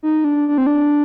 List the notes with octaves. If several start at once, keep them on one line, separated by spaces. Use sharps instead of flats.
D#4
D4
D4
C4
D4